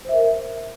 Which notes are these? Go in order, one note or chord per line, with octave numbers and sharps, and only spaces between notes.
A#4 C5 E5